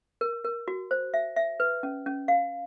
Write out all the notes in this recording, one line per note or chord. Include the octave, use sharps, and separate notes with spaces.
A#4
A#4
F#4
C5
E5
E5
B4
C#4
C#4
F5